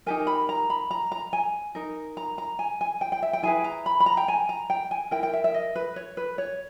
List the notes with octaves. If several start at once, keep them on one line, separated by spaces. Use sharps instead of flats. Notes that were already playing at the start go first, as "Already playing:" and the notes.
D#4 G4 A#4 G#5
B5
A#5
B5
A#5
A#5
G#5
D#4 A#4
A#5
A#5
G#5
G#5
G5
G5
E5
G5
E4 G#4 B4 G#5
A#5
B5
B5
A#5
G5
G#5
A#5
G5
G#5
E4 A#4 G5
G5
E5
E5
D#5
B4
C#5
B4
C#5